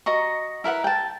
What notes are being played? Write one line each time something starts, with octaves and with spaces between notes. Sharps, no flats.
F#4 D#5 A#5 C#6
E4 A#4 B4 F#5
G5 A5